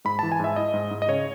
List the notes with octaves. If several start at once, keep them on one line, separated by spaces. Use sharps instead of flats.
G#2 B5
A5
E3
G#5
G#2 E5
E4 D#5
G#2
G#2
D#5
C#3 C#5